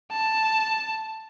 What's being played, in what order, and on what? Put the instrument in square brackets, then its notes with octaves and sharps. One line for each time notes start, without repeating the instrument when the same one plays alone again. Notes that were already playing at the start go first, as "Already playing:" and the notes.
[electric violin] A5